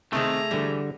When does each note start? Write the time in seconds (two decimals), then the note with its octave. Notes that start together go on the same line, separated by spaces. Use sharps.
0.13 C3 D#3 A3 C4 G#4 A#5
0.51 D3 E3 G3